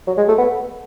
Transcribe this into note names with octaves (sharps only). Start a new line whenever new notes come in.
F#3
G#3
A3
B3